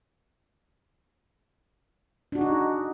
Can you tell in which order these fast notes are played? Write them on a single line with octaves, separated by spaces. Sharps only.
D4 F#4 G#4 D#4